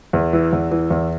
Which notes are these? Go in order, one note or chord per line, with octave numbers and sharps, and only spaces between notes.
E2
E3
E2
E3
E2